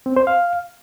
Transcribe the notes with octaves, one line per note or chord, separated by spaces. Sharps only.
C4
C5
F5